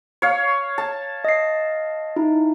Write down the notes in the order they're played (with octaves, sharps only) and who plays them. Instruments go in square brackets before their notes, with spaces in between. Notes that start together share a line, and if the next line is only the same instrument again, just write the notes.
[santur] C#5 F5
A5
[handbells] D#5 C7
D#4 E4